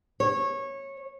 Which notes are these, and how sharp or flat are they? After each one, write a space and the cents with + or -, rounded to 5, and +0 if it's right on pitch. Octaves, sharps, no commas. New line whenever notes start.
C#5 -20